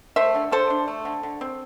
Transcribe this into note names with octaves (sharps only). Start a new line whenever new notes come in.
A3 C5 E5
D3
D3 A4 C5
D4
A3
D3
D3
C4